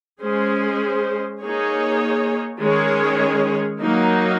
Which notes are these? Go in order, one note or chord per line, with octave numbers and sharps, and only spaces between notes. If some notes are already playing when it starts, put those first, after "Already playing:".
G#3 C#4 G#4 C5
A#3 D#4 G#4 C#5
D#3 G#3 C#4 G#4 C#5
F#3 A#3 D#4